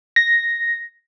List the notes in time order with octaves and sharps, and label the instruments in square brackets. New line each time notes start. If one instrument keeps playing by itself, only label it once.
[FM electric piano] A#6